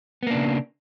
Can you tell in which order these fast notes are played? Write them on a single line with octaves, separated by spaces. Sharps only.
B3 A#3 D4 C#3